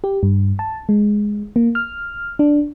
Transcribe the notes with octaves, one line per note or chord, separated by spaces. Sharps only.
G4
G2
A5
G#3
A#3
F6
D4